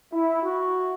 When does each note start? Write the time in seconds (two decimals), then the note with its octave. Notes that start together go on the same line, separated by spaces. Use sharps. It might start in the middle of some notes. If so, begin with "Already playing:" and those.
0.13 E4
0.43 F#4